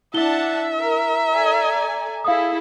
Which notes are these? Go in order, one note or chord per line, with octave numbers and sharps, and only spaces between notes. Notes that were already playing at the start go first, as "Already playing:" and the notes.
D4 E4 E5 F#5 A5 G7
A#4 A#5
A4 D5 G#5
E4 G#4 A4 F5 D#6